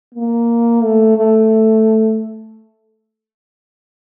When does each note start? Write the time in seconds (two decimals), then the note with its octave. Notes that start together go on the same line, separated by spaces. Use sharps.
0.14 A#3
0.83 A3
1.17 A3